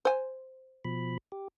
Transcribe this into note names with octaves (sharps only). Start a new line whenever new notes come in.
C5 G#5
B2 F3 B5
G4